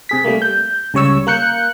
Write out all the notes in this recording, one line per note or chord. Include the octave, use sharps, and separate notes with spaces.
C3 G#4 B6
G3 A3 A#3
G6
C#2 C#3 G3 C#5 C#6 E6
A#3 A#4 F#6 G6 C#7